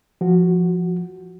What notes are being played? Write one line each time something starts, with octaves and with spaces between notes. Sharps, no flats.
F3 F#4